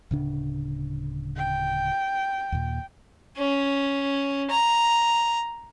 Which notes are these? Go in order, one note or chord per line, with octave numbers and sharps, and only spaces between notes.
D1 C#3 D4
G5
D#2 A#2
C#4
A#5